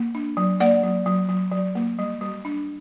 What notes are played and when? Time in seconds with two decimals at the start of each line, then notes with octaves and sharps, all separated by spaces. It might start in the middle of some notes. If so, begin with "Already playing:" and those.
Already playing: A#3
0.15 D4
0.37 F#3
0.60 A#3 D5 F#5
0.83 F#3
1.06 F#3
1.29 F#3
1.52 F#3
1.75 A#3
1.99 G3
2.21 G3
2.45 D4